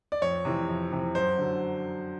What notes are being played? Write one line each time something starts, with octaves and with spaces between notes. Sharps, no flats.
D5
F2 C#5
C3 E3
F2
C3 E3
F#2 C5
D3 F#3